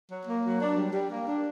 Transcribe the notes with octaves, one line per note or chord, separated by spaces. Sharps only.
F#3
A#3
F#3
D4
G3
G3
A#3
D4